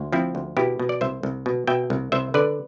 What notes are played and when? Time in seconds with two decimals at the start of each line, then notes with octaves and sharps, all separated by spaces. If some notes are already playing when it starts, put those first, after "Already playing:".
Already playing: D2
0.12 F3 C4 E4
0.35 D2
0.57 B2 E4 G4
0.79 B2
0.89 D5
1.01 C2 C5 E5
1.23 C2
1.46 B2
1.67 B2 E5 G5
1.90 C2
2.12 C2 C5 E5
2.34 D3 B4 D5